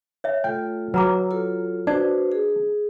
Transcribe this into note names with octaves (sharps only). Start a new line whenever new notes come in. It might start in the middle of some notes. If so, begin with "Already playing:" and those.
C#5 E5
A3 F4 A4 G5
F#3 B4 A#5 D6 E6
F4 A4
D4 F#4 B4 C5 D5
G#4